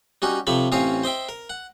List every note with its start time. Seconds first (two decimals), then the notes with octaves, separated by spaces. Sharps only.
0.22 G3 C#4 D#4 F#4
0.47 C3 F3 A4 C#5 B5
0.72 A1 C4 C#4 C#5 F5 D#6
1.04 C5 D#5 E5 G5
1.29 A#4
1.50 F#5